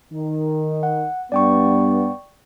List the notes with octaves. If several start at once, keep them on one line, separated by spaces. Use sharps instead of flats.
D#3
F#5
G2 B3 D5 G5 C#6